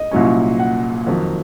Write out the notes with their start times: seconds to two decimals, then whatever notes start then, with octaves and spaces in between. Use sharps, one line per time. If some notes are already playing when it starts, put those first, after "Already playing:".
Already playing: D#5
0.11 C2 A#2 F#3 C#4
0.59 F#5
1.06 F2 D#3 F#3